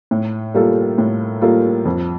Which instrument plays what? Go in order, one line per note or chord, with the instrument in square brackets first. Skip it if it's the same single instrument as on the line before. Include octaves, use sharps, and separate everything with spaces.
[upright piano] A2
G3 A#3 F4 A4
A2
G3 A#3 F4 A4
F2